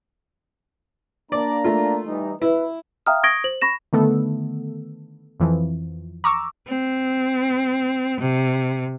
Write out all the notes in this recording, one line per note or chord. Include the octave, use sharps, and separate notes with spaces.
A#3 D4 D5 A#5
A3 F4
E3 G3 D#4
E4 B4
E5 F5 G5 A#5 D#6 F6
C#6 D#6 G#6 A#6 D7 G7
C5 F#7
B5 C#6 A#6 E7
D3 D#3 A3 B3 A4
F2 E3 F3
A#5 C#6 D6 E6
C4
C3